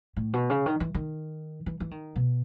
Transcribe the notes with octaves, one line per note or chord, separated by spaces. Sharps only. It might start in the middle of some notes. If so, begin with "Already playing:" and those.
A2
B2
C#3
D#3
E3
D#3
E3
E3
D#3
B2